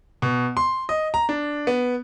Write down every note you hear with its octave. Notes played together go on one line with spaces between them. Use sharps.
B2
C6
D#5
A#5
D4
B3